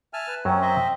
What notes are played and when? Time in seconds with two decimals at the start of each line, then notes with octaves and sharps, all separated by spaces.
0.13 E5 G#5 A5 F6
0.28 B4
0.45 F#2 F#3 C4 C#4
0.62 C5 D#5 E5